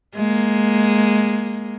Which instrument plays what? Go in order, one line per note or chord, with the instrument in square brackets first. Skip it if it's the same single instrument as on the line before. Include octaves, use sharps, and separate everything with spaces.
[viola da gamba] G#3 A#3